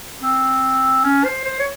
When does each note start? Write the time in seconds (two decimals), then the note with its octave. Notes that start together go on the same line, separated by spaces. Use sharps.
0.22 C4
1.04 C#4
1.25 C5
1.44 C5
1.59 C#5